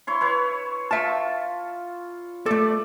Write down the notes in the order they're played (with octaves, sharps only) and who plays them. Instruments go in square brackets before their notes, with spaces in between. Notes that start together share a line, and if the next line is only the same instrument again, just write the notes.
[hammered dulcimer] E4 C#5 C6
E4 B4 C#5
[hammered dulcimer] F4 [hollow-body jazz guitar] E5 A5
[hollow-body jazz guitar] A3 A4 [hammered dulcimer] D5